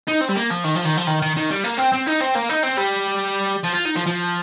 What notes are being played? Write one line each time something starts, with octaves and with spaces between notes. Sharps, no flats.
D#4
C4
G3
A#3
F3
D#3
F3
D#3
F3
D#3
D#3
D#3
G3
A#3
C4
C4
D#4
C4
A#3
D#4
C4
G3
F3
F4
D#4
F3
F3